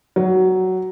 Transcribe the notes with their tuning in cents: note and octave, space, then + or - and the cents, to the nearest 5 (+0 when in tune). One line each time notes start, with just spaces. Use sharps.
F#3 +10